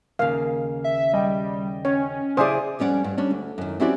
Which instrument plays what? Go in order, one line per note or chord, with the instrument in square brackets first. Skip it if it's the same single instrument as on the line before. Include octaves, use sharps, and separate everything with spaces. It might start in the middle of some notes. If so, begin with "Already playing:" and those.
[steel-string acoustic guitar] D#2 C#3 [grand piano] A#3 [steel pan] F5
[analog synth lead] E5
[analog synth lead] G3 [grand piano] D#5 G5
[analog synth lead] C#4 [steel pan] C#5
[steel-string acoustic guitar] C#3 E4 G#4 [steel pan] C5 D5 [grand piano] E5 G#5 D#6
[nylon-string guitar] F2 G3 C#4 D5 F#5
G2
G3 C#4 D4
D2
F#2 D#3
C4 C#4 E4 F#4 G4 D5